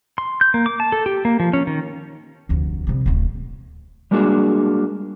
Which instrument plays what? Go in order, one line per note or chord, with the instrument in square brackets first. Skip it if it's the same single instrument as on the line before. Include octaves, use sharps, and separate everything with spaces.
[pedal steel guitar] C6
G6
A#3
D6
A5
A4
G4
A#3
F3
C#4
D#3
[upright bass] F1 D2
C3 G3
D1 A3
[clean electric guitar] G3 G#3 A#3 D4 F#4 G#4